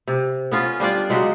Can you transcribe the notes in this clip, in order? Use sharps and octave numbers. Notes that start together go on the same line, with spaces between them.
C3
B3 C#4 F4
G3 D4 F4 D5
C#3 F#3 G#3